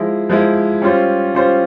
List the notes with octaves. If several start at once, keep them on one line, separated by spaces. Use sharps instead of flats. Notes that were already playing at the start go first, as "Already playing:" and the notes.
Already playing: F3 G#3 E4
F3 G#3 E4
G3 C#4 F4 C5
G3 C#4 F4 C5